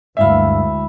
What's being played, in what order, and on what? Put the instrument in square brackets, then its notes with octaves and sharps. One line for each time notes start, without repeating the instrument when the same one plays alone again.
[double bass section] D2 [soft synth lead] G2 [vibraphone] G#3 E4 B5 [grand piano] E5 F5